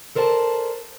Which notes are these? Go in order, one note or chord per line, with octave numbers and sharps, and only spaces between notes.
A4 A#4 C5 D5 F#5 A5